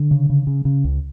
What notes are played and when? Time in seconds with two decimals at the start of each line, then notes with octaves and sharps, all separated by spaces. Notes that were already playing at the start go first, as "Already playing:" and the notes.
Already playing: D3
0.11 C#3
0.30 C#3
0.47 C#3
0.65 C#3
0.84 C#2